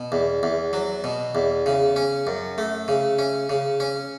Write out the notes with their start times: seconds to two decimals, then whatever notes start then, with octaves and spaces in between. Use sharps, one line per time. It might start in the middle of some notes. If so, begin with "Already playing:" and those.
Already playing: B2
0.12 E2
0.43 E2
0.73 F#3
1.04 B2
1.35 E2
1.66 C#3
1.96 C#4
2.27 F#2
2.58 A3
2.88 C#3
3.19 C#4
3.49 C#3
3.80 C#4